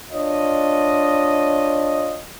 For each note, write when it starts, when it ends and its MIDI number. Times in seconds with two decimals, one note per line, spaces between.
0.12 2.22 62
0.12 2.22 65
0.12 2.22 73
0.12 2.22 75